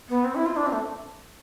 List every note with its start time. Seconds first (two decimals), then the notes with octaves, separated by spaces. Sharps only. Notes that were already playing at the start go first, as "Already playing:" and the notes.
0.09 B3
0.24 C4
0.35 E4
0.45 F4
0.56 D4
0.66 C4
0.72 A3